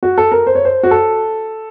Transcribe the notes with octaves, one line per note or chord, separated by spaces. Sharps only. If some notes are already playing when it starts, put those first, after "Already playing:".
F#4
A4
A#4
C5
C#5
C5
F#4
A4